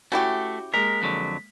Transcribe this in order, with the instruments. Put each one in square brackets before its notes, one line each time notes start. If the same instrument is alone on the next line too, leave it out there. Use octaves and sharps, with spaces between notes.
[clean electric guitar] A3 [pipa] C#4 E4 G4 [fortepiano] F#4
[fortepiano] G#3 A#3 [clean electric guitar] A#4 [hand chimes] B6
[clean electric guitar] F2 D3 F#3